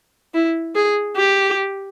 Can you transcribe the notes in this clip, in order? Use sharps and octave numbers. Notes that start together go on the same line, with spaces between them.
E4
G#4
G4